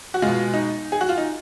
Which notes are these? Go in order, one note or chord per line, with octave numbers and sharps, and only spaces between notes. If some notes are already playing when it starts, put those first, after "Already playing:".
F#4
B2 G#3 F4
D#4
G#4
F#4
F4
D#4